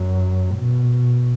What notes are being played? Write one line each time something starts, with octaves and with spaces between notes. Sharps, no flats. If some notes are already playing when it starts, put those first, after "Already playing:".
Already playing: F#2
B2